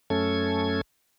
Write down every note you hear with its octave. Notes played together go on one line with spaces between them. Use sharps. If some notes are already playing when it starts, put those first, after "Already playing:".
F#2 A3 C#4 A4 G#6